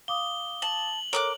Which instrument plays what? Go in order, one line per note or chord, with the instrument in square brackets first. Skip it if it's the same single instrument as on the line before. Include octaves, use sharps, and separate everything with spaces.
[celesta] F5 D6 D#6 [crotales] G7
[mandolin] A5 [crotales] F#7
[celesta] A4 C#5 [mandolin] A#4 D6 F#6